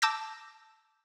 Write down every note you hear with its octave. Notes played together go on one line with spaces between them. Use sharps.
A5 D6 E6 G6 A#6